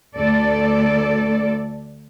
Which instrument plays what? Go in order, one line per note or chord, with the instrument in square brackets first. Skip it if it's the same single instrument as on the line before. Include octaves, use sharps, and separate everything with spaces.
[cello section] D2 A4 D5